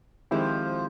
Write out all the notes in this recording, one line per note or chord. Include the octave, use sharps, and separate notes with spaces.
F2 D#3 F3 G#3 C4 E4 G4